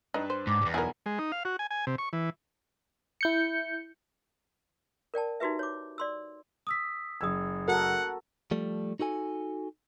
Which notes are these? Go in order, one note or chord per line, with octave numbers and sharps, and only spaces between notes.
G2 D4 D#4 B4
C5
G#2 D6
E2 G#2
B1 B2 E4 A#4 D5 G#5
G#3
D#4
F5
F#4
G#5
G#5
C3
C#6
E3
E4 G6 C#7
A#4 D5 G5 A5
D#4 E4 F#4 G4 B4 E5
C#5 D6
D5 C6 E6
D#6 E6 B6
F#1 D#6 E6 G#6
F#4 A4 A#4 F#5
F3 G3 A3
D#4 F#4 A4 G#5